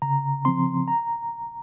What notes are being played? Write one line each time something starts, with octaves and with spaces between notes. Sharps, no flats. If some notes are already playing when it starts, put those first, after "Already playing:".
C#3 A#5
F3 C4 C6
A#5